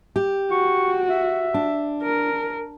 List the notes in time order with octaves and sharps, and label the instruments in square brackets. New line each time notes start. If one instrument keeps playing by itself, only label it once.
[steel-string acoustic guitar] G4
[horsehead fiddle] F#4 [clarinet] C#6
[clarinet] E5
[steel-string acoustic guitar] D4
[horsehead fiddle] A#4